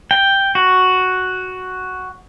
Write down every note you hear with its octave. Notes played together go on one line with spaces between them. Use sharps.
G5
F#4